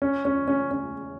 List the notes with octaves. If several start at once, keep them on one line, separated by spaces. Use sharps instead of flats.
C#4
C#4
C#4
C#4